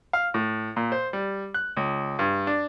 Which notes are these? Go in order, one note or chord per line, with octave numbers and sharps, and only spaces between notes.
F5
A2
A#2
C5
G3
F#6
C#2
G2
D4